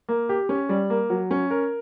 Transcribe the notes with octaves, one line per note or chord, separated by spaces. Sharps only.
A#3
G4
C#4
G3
A#3
F#3
C#4
A#4